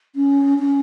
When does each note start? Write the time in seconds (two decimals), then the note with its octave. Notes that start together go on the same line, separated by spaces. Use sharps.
0.15 C#4
0.59 C#4